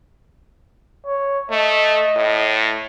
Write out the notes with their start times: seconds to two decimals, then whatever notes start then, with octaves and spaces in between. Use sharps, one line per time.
1.06 C#5
1.51 A3 D#5
2.16 A2